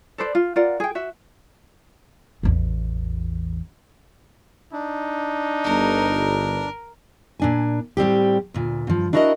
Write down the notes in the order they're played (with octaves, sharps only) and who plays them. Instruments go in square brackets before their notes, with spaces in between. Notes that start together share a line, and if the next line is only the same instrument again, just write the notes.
[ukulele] A4 B4 C5 D5
F4
F4 A#4 D5 F#5
G#4 G5
F#4 E5
[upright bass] A1 E2
[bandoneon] D4 [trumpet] D#4
[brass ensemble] G1 [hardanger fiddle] A#4
[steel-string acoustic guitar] A#2 D4 G#5
A2 G3 C4 G4
D2 A#2
G2 F3
D4 E4 F#4 A#4 B4 D#5